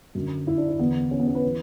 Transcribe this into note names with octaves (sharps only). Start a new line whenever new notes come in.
F#2 D3
E4
D4
D4
E2 D3 B3
C#4
B3
C#4
B4
E3